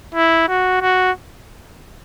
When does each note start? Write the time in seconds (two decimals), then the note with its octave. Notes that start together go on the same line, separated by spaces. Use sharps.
0.15 E4
0.48 F#4
0.81 F#4